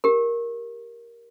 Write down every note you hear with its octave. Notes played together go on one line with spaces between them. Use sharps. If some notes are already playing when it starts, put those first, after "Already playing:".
G4 A#4